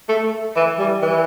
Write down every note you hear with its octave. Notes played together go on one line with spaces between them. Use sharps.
A3
E3
G3
E3